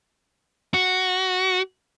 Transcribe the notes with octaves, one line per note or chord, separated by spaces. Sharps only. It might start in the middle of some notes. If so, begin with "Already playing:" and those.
F#4